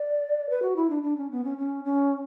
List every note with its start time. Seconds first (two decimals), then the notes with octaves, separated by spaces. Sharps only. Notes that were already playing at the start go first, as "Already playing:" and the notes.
Already playing: D5
0.50 B4
0.62 F#4
0.76 E4
0.90 D4
1.03 D4
1.17 C#4
1.31 B3
1.44 C#4
1.58 C#4
1.85 C#4